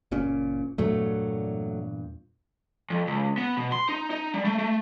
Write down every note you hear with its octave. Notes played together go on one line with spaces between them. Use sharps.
F#1 A#2 C#4
E2 G2 A#2 F#3 A3
F2
C#2
B3
B2
C6
D#4
D#4
G3
A3
A3